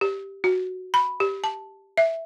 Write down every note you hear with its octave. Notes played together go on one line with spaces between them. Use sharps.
G4
F#4
B5
G4
A5
E5